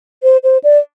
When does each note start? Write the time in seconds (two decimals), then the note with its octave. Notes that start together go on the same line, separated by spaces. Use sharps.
0.23 C5
0.44 C5
0.64 D5